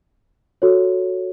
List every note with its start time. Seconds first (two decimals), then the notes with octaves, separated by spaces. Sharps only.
0.62 F#4 A4 C#5